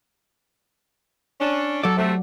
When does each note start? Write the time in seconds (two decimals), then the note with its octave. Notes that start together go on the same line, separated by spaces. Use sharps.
1.41 C#4 D4
1.84 F#3 A4 D5
1.98 C3 A3